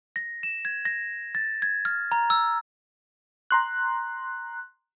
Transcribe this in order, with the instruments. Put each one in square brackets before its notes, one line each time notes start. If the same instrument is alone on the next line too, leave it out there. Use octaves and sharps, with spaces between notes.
[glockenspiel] A#6
E7
G#6
A#6
A6
G#6
F6
A#5
E6
[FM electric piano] A#5 C6 F#6